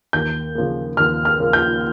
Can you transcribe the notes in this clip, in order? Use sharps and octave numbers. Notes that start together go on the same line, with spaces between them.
D#2 G6
C#3 F3 A#3
D#2 F6
F6
C#3 F3 A#3
G6